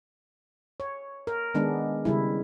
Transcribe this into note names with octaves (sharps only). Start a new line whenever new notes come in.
C#5
A#4
D#3 G#3 B3 D4
C#3 G3 E4